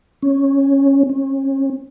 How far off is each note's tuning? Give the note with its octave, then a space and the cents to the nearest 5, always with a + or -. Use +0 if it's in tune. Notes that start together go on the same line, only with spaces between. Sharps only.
C#4 -10
C#4 -35